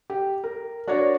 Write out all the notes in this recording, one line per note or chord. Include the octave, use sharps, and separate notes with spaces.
G4
A#4
D4 F#4 A#4 C#5 D5